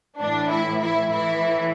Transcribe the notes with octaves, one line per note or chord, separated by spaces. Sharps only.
A2 E3 D4
E4
E4
A2 E3 E4